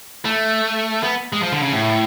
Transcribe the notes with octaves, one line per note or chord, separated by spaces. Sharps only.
A3
B3
G#3
F3
D3
C#3
A2